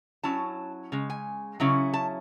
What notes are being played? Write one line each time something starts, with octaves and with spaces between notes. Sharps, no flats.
F#3 C#4 E4 A5
C#3 G#3
G#5
C#3 F#3 C#4 E4
A5